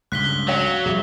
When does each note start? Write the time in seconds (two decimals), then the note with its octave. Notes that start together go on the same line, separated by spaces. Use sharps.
0.12 C#2 G2 F#6 B6 G7
0.48 F#3 C#5 F5 G5
0.85 F2 C3 G3 G#4 E5